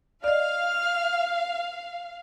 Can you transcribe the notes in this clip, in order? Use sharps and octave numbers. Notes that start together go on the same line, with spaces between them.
D5 D#5 F5 F6